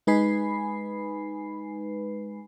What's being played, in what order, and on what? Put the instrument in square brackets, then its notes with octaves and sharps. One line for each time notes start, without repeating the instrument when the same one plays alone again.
[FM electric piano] G#3 D#4 B4 G#5 B5 C7